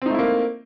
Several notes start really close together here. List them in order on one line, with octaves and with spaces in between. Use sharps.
C4 D#4 A3 E4 A#3